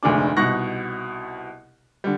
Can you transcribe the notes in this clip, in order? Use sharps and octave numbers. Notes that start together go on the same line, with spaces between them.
F1 D2 G#3 D4 D6
C2 B2 D#4 C#6 F#6 A#6
D3 G3